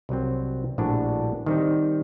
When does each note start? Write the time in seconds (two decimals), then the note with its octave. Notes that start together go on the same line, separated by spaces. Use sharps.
0.09 C2 C3 F#3 C4
0.78 A#1 A2 G3 D4 F#4
1.46 D#3 G3 C4 D#4